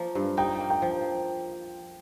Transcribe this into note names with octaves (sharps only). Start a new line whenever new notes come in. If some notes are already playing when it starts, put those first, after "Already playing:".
Already playing: F3 A#3
G2
D#4 G5
A#3
G5
F3